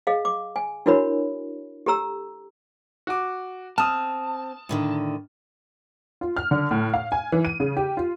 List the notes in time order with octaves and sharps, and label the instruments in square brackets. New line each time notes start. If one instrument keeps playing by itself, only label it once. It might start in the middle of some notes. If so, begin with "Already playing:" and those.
[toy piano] G#4 D#5 F5
D6
G#5
D4 E4 F#4 A#4 C#5 B5
G4 A4 A#5 E6
[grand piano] F#4 D6
[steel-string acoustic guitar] C4 [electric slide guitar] A5 [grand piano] D#6 F6
[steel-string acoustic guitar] A2 D3 D#3
[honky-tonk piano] F4
F6
D3
A2
F5
G#5
E3
D#7
C#3
G4
F4